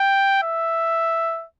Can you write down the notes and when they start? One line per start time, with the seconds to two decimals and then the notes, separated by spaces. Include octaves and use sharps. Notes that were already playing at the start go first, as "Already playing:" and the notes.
Already playing: G5
0.43 E5